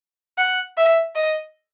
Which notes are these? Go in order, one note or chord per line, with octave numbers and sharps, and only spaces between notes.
F#5
E5
D#5